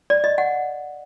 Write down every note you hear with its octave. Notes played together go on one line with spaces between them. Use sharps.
D5
D#5
F#5